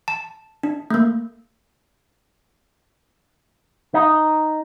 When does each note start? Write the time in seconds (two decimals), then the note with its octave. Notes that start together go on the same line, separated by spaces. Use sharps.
0.08 A5
0.63 D4
0.90 A3 A#3
3.94 D#4